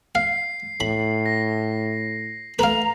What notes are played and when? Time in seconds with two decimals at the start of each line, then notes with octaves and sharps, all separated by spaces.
0.15 F5 C7
0.80 A2 B5
1.26 A#6
2.59 A3 B4 F5 A#5